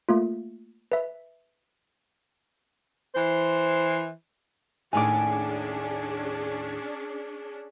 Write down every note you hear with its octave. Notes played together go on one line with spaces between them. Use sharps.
A3 A#3 F4
B4 E5
E3 C5
D#2 A2 C#4 D4 G#4 G#5 D6